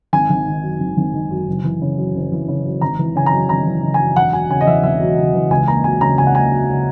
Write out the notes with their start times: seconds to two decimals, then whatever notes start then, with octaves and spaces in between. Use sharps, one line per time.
0.13 G#1 G#5
0.30 G#1
0.47 D#3
0.63 F#2
0.80 G#1
0.97 G#1
1.14 D#3
1.31 F#2
1.47 F#1
1.64 E3
1.81 C#3
1.98 F#2
2.15 F#1
2.32 E3
2.48 C#3
2.65 F#2
2.81 G#1 A#5
2.99 E3
3.15 C#3 G#5
3.26 A#5
3.32 F#2
3.49 G#1 A#5
3.66 E3
3.83 C#3
3.94 G#5
4.00 F#2
4.16 E1 F#5
4.33 F#3 G#5
4.50 C#3 G#5
4.61 D#5
4.67 E2 E5
4.83 E1 E5
5.00 F#3
5.17 C#3
5.34 E2
5.50 C#2 G#5
5.68 A#3 A#5
5.84 F#3 G#5
6.01 C#3 A#5
6.18 C#2 G#5
6.27 F#5
6.35 A#3 G#5
6.52 F#3
6.69 C#3